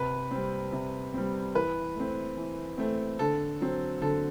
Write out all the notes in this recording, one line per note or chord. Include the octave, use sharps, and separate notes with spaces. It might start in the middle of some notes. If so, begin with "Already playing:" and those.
Already playing: C3 B4
G3 C4
C3
G3 C4
E3 B4
A3 C4
E3
A3 C4
D3 A4
F#3 C4
D3 A4